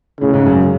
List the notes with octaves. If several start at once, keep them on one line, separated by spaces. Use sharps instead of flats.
A2 C#3
G#2
F#2